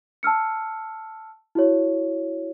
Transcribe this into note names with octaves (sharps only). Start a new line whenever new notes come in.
A5 E6 F6 C#7
E4 F#4 C#5